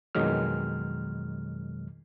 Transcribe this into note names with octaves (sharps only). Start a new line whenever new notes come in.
F2 B2 D#3 F#3 G#3 F6